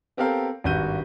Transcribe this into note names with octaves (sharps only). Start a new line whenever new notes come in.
B3 C4 G4 A4 A#4 F5
G#1 G2 F#4 G6 D#7